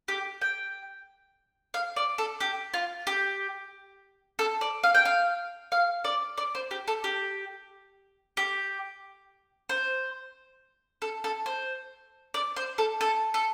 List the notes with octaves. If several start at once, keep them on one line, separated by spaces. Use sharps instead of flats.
G4
G5
F5
D5
A4
G4
F4
G4
A4
D5
F5
G5
F5
F5
D5
D5
C5
G4
A4
G4
G4
C5
A4
A4
C5
D5
C5
A4
A4
A4